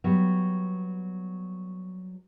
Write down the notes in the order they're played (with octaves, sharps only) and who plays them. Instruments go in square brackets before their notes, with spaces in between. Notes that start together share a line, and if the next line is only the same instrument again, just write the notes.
[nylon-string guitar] F#3 G3 B3